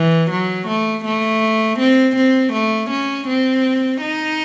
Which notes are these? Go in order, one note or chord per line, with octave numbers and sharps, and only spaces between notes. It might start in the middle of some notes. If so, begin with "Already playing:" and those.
Already playing: E3
F#3
A3
A3
C4
C4
A3
C#4
C4
D#4